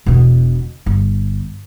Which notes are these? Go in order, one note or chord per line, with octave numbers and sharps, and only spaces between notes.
E1 B2
G1